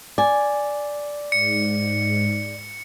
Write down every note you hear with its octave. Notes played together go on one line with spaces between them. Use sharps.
D5 G#5
G#2 C#7